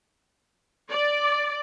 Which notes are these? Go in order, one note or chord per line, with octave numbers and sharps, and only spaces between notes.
D5